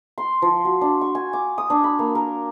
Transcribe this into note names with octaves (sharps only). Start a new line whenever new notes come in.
C6
F3
F#4
D4
C#6
G#5
D6
D#6
D4
B5
A#3
A#4